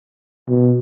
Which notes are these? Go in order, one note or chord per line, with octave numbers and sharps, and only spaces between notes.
B2